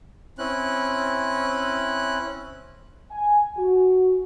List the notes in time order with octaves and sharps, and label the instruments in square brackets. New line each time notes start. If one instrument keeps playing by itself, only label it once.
[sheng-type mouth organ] C4 C#4 E4 F#6
[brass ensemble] G#5
F#4